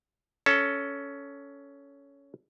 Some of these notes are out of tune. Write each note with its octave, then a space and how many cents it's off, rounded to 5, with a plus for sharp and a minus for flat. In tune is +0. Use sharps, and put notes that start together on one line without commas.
C#4 +15 A4 +0